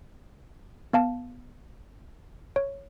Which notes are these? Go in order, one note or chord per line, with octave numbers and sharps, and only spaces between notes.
B3 F5 A5
C#5